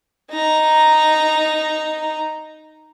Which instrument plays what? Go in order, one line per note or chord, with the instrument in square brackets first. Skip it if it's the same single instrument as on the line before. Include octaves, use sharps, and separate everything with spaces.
[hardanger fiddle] D#4 A#5